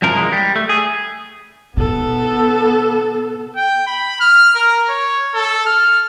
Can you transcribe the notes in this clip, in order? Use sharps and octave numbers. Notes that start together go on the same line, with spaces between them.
C2 F#2 F3 A#4
E3 G#3 A#3
G3
A3
G#4
B2 B3 A4
G5
B5
F6
A#4
C#5
A4
F6